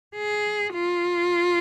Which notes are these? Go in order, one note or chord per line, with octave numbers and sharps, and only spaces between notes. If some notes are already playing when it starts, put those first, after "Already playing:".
G#4
F4